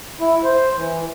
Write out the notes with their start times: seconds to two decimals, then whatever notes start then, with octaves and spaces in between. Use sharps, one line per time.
0.20 E4
0.44 C5
0.76 E3